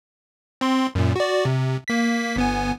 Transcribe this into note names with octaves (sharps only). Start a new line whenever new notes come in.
C4 C6
F#2 A#2
F#4 D5
C3
A#3 B6
G1 B3 G#5